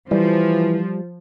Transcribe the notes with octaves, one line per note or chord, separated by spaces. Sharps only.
E3 F3 G3